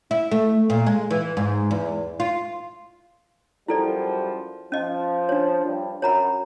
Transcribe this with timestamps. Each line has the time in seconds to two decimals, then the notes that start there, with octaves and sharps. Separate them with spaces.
0.11 E4
0.32 A3
0.70 A#2
0.86 G#3
1.11 E3
1.37 G#2
1.71 E2
2.20 F4
3.68 F#2 F3 G3 E4 A4 D5
4.72 F3 C#4 D#5
5.29 D4 C#5
5.65 G2
6.02 F#2 C#5 A#5 B5